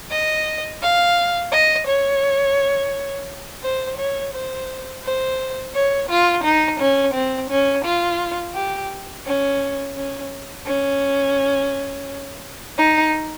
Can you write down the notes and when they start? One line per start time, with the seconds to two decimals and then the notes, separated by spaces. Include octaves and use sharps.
0.11 D#5
0.82 F5
1.52 D#5
1.87 C#5
3.63 C5
3.98 C#5
4.34 C5
5.04 C5
5.75 C#5
6.09 F4
6.44 D#4
6.80 C#4
7.14 C4
7.50 C#4
7.85 F4
8.55 G4
9.26 C#4
9.96 C#4
10.66 C#4
12.78 D#4